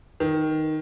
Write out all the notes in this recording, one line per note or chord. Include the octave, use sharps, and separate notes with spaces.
D#3